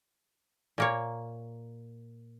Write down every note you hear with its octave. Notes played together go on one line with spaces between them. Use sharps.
A#2 A#3 C#5